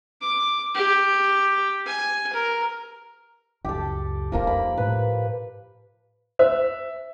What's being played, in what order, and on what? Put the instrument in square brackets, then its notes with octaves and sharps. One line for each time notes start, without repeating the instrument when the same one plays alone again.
[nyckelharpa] D6
G4
G#5
A#4
[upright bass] C#2 F#2 [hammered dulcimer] G4 A4
[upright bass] F2 D#4 [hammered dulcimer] F3 A#3
[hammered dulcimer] B5
[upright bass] A2 [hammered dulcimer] B4
[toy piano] C5 [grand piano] E5